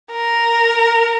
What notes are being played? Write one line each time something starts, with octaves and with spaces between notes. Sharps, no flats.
A#4